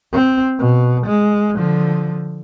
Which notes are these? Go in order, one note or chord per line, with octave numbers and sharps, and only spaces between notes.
C4
B2
G#3
D3 F3